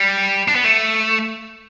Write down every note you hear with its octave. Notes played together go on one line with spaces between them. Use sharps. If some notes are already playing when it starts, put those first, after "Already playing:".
Already playing: G3
D4
B3
A3